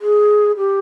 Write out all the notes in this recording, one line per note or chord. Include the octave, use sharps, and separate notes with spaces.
G#4
G4